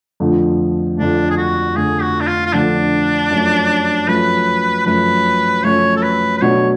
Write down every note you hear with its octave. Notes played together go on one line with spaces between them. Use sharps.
F2 D3 F3 A3
F2 D3 F3 A3 D4
G#4
F#4
F2 D3 F3 A3 G#4
F#4
D4
F4
F4
F2 D3 F3 A3 D4
F#2 F3 A3
F#2 F3 A3 B4
F#2 F3 A3 B4
F#2 F3 A3 C#5
A4
B4
B4
B2 F#3 A3 D4 C#5